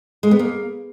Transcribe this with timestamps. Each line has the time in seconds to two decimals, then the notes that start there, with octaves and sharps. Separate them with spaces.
0.23 G#3
0.31 B3
0.39 A#3